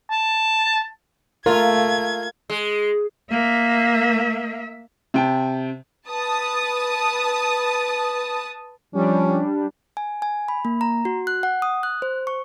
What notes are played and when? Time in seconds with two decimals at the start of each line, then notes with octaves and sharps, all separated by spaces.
0.10 A5
1.46 A3 F4 A#4 G#6
2.50 G#3
3.30 A#3 E5
5.14 C3 G5 A5
6.08 B4 A5 D#6
8.94 F3 G3 C#4 D4
9.97 G#5
10.22 G#5
10.48 B5
10.65 A#3
10.81 A#5
11.05 F#4
11.27 F#6
11.43 F#5
11.62 D#6
11.83 F#6
12.02 C5
12.27 C#6